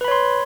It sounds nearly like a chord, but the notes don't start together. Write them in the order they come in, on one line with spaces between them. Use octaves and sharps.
B4 B5 C#5 C6